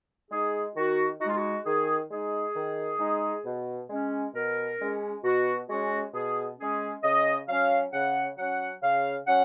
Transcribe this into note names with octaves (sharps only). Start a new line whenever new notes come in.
G#3 D#4 G#4
D#3 F#4
G#3 D#4 F4 F#4
F#4
D#3 G#4
G#3 D#4 G#4
D#3
G#3 D#4
B2
G#3 C#4
B2 A#4
G#3 C#4
B2 F#4
G#3 C#4 F#4
B2 G#4
G#3 C#4 G#4
C#3 D#5
F#3 C#4 F5
C#3 F#5
F#3 C#4 F#5
C#3 F5
F#3 C#4 F#5